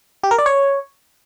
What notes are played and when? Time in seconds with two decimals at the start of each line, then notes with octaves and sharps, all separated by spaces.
0.23 G4
0.31 A#4
0.38 D5
0.46 C#5